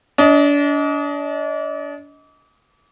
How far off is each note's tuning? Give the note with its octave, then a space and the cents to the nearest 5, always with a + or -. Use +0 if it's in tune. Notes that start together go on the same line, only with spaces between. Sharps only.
D4 -35 D#5 +15